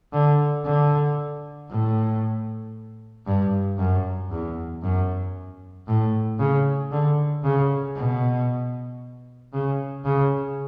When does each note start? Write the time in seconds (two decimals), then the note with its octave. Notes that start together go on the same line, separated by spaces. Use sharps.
0.13 D3
0.65 D3
1.70 A2
3.27 G2
3.79 F#2
4.31 E2
4.83 F#2
5.87 A2
6.40 C#3
6.92 D3
7.44 C#3
7.96 B2
9.53 C#3
10.05 C#3